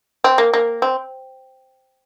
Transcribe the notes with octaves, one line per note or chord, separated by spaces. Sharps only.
C4
A#3
A#3
C4